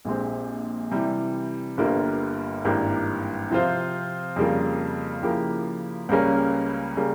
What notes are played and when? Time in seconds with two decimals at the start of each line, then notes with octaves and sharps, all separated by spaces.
0.05 A#1 A#2 G#3 C4 G4
0.91 C3 E3 G3
1.77 G1 G2 G3 A#3 F4
2.65 G#1 G2 E3 G3 A#3
3.51 C3 F3 C4 F4 C5
4.36 F2 C#3 G3 A#3 F4
5.23 C#3 F3 A#3 E4 G4
6.09 C#2 C#3 G3 A#3 C#4
6.97 C#3 G3 A#3